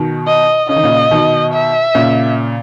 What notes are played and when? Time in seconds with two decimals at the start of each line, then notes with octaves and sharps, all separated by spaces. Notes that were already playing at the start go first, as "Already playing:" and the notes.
Already playing: B2 D#3
0.27 D#5
0.69 C#3 D#5
0.76 D#3
0.83 A#2 C#3
1.11 B2 D#3
1.53 E5
1.95 A#2 C#3